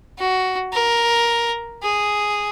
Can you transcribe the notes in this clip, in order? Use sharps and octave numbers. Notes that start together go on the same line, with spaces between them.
F#4
A#4
G#4